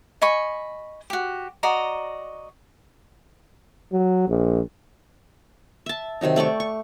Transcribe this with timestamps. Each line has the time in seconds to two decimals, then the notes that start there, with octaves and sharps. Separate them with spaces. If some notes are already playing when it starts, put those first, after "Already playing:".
0.22 D#5 G#5 B5 C#6
1.10 F#4 G4
1.63 F#4 D5 D#5 A#5
3.92 F#3
4.28 A#1
5.86 E5 A5
6.21 C3 D#3 F#3 D#4
6.36 A3 D5 G5 C#6
6.60 C#6